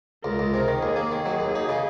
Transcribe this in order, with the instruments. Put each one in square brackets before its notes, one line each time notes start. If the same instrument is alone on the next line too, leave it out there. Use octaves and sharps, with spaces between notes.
[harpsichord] C#2 [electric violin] A#4
[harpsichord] C#2
C3
D#3
[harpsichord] D#2 [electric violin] G#4
[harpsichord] A#3
[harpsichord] D#3 [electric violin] G#4
[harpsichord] F#3
D#2
D#4
C#3